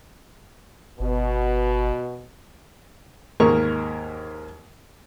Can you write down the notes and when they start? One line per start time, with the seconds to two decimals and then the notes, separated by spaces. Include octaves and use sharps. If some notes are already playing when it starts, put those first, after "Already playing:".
1.00 G1 B2
3.40 D#2 G#2 A#3 A#4 C#6